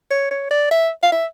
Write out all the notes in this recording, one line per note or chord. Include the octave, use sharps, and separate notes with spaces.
C#5
C#5
D5
E5
F5
E5